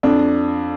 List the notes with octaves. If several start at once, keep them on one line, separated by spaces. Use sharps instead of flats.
F2 D4